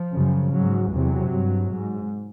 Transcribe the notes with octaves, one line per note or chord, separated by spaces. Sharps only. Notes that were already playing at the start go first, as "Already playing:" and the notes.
Already playing: F3
F#2 C#3
G#2 F#3
E2 C3 F#3
G2
G#2